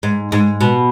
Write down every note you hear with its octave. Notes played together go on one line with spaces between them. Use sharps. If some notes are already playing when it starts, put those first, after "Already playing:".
G#2
G#2
B2